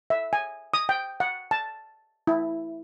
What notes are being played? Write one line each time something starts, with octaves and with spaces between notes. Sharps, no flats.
E5
G#5
D#6
G5
F#5
A5
E4